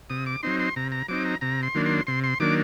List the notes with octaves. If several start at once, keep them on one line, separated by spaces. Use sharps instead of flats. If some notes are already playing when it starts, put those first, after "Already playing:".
C3 D#6
D6
F#3 C4 D#4 C6
C6
C3 A#5
A#5
F#3 C4 D#4 D6
A#5
C3 A#5
C6
D#3 F#3 A#3 D4
C6
C3 C6
C6
D#3 F#3 A#3 D4 D6